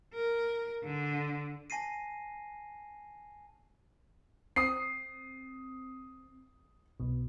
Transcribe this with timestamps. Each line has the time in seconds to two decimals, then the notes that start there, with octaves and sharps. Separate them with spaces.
0.14 A#4
0.84 D3
1.70 G#5 A5 A#6 C7 D#7
4.56 C4 D#6 C7
7.00 B1 B2